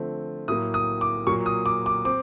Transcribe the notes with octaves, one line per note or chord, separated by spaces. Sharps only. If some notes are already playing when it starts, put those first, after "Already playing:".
Already playing: D3 F3 A3 C4
A2 F#3 A#3 D#6
D#6
D6
A#2 F#3 A#3 C#6
D#6
D6
D6
C4 D6